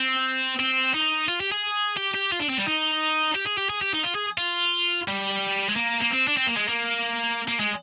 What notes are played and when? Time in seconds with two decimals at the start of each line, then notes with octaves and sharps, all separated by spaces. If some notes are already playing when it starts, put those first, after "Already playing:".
Already playing: C4
0.59 C4
0.94 D#4
1.28 F4
1.40 G4
1.52 G#4
1.97 G4
2.14 G4
2.32 F4
2.40 D4
2.49 C4
2.58 G3
2.67 D#4
3.35 G4
3.46 G#4
3.57 G4
3.69 G#4
3.81 G4
3.93 D#4
4.04 F4
4.15 G#4
4.38 F4
5.08 G3
5.69 G#3
5.76 A#3
6.01 A#3
6.10 C4
6.27 D4
6.37 C4
6.47 A#3
6.57 G#3
6.68 A#3
7.48 A#3
7.59 G#3